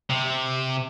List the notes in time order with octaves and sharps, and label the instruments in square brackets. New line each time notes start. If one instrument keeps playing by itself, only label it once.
[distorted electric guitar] C3